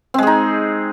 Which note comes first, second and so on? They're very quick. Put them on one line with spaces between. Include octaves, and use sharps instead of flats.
C4 G#3 G#4 D#4